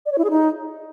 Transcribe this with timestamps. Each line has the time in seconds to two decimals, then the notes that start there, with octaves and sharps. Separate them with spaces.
0.06 D5
0.12 C#5
0.18 E4
0.24 G#4
0.30 D#4